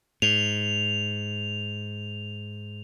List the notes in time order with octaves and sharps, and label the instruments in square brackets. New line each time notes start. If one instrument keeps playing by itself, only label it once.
[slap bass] G#2 [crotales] F7